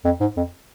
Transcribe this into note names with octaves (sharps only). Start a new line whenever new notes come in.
F2
G#2
F2